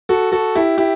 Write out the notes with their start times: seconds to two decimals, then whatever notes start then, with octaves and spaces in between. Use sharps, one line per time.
0.09 F#4 A4
0.32 F#4 A4
0.55 E4 G4
0.78 E4 G4